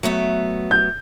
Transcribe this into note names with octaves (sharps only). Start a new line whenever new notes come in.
F#3 A3 B3
G6